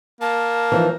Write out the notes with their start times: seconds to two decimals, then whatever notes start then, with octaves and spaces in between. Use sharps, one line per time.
0.21 A#3 A5
0.72 E3 F3 D#4